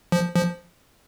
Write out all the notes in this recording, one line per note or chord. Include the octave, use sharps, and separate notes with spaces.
F3
F3